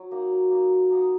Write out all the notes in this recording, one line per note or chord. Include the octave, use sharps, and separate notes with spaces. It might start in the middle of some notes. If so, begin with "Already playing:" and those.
Already playing: F#3
A#3 D#4 F#4
F#3
A#3 D#4 F#4
F#3
A#3 D#4 F#4